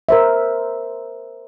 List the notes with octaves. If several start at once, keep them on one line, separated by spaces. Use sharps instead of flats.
A#4 C5 E5